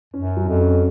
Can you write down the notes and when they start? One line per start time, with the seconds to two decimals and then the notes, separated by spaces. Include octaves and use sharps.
0.14 F#2 C#4
0.37 F#3
0.48 F2
0.60 C#4